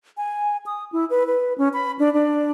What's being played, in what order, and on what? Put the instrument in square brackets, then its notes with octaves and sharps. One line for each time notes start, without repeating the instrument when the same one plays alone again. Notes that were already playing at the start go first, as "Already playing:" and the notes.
[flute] G#5
D#6
E4
B4
B4
C#4
B5
D4
D4